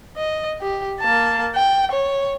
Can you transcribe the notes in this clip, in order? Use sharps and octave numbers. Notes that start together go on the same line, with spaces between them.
D#5
G4
A#3 A5
G5
C#5